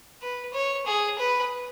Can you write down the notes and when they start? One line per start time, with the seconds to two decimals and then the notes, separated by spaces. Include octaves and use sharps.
0.22 B4
0.53 C#5
0.86 G#4
1.18 B4